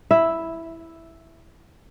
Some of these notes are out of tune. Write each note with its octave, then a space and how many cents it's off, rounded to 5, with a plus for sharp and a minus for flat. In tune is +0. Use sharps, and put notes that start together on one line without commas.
E4 +0 E5 +0